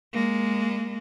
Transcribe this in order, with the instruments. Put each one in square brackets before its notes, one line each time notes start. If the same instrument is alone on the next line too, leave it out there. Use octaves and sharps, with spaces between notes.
[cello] G#3 A#3